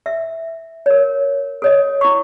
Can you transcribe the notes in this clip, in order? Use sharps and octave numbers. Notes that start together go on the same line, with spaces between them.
E5
A#4 C#5
A4 C#5 D#5
E4 C#6